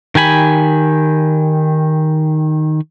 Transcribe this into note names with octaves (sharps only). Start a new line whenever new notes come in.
D#3 G4 G#5 B5